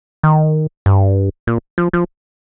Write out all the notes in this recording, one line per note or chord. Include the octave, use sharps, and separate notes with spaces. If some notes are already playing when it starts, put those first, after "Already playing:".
D#3
G2
A#2
F3
F3